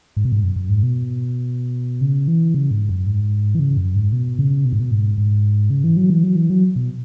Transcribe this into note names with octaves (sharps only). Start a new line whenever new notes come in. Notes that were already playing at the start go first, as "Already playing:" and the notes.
G#2
B2
G#2
F#2
F#2
G#2
B2
C#3
E3
C#3
G#2
F#2
G#2
E3
C#3
F#2
G#2
B2
C#3
B2
G#2
B2
G#2
G#2
C#3
E3
F#3
E3
F#3
E3
F#3
B2